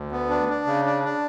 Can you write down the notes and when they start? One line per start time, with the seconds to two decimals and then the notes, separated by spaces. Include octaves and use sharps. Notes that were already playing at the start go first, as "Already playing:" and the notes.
Already playing: D2
0.12 B3
0.29 D4
0.49 D4
0.67 C#3
0.85 D4
1.04 D4